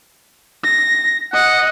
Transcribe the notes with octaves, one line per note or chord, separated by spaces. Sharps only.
A#6
D#5 F#5